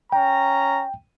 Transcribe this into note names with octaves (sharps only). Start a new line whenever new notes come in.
C#4 G5 A#5